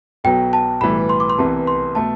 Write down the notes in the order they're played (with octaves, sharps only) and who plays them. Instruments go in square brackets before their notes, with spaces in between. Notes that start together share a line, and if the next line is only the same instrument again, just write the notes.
[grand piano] B1 B2 F#3 [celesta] G5
[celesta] A5
[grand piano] B1 A2 E3 G3 [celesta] B5
[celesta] C6
D6
C6
[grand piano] C2 C3 E3 B3 [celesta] A5
[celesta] C6
[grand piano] B2 A3 [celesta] A5